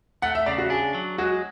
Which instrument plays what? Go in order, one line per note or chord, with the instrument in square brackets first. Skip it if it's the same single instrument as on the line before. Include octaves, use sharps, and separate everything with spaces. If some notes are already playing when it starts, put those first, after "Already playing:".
[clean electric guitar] A3 [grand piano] F#5
[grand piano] E5
[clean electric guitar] C#3 [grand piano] D5
[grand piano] F#4
[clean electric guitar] D4 [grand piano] G#4
[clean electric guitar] F#3
[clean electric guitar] G#3 [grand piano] F#4